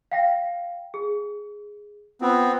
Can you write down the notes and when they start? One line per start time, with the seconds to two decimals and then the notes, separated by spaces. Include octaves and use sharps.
0.12 F5 G5 A#6
0.94 G#4
2.21 B3 C4 F4